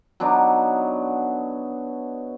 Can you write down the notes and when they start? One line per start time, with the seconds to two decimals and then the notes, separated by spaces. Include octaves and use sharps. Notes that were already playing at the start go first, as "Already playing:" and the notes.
0.20 F#3 B3 D4 D#4